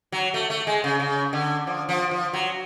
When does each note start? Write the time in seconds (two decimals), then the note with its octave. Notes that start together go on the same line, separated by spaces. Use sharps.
0.12 F#3
0.34 A3
0.50 A3
0.67 G#3
0.84 C#3
1.00 C#3
1.33 D3
1.67 F3
1.89 F3
2.11 F3
2.33 F#3